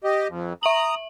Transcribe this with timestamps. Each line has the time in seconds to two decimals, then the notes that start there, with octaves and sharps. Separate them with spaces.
0.04 G4 D#5
0.28 F2
0.63 E5 A#5 D#6 F#7